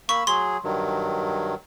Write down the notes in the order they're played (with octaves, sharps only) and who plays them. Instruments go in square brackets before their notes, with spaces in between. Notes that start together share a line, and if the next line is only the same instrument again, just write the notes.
[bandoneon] A#3 B5 E6 [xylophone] C#6
[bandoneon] F#3 G#4 [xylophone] C6
[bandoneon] G2 D#3 F#3